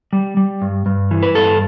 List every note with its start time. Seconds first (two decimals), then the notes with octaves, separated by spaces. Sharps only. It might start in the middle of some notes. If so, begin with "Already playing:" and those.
0.13 G3
0.37 G3
0.62 G2
0.86 G2
1.11 E3
1.23 B4
1.35 G2 A4